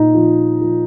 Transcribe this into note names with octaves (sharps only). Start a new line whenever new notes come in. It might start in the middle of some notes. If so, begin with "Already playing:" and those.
Already playing: A#2 D#4
F3
F3